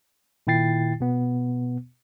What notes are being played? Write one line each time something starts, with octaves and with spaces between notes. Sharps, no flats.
A#2 D#3 E4 G5 A6 C7
B2 B3